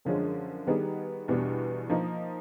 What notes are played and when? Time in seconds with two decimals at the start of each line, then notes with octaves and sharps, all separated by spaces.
0.05 F#2 D3 F3 G#3 C#4
0.67 D#3 G3 B3 D#4 G#4
1.28 E2 B2 G3 B3 D4
1.89 F3 A#3 D#4